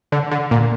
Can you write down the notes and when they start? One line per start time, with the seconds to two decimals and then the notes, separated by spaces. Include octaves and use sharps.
0.12 D3
0.31 D3
0.51 A#2